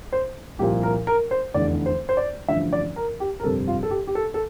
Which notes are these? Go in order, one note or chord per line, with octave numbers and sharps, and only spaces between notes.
C5
C2 A#2 F3 G4
A#4
A#4
C5
F1 E2 D3 D5
C5
C5
D5
A1 G2 D3 F3 E5
D5
A#4
G4
A#4
G1 F2 C3 G3 A4
F4
A4
G4
G4
A4
A4